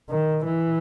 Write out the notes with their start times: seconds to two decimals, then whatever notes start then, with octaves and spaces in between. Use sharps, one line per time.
0.09 D#3
0.45 E3